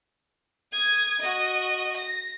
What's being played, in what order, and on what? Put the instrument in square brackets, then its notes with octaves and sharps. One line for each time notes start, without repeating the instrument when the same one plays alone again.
[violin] D#6 G#6
F#4 D#5
A#6